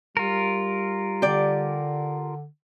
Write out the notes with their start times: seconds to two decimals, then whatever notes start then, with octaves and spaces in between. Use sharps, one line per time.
0.17 G3 F4 A#4
1.22 D3 G4 D5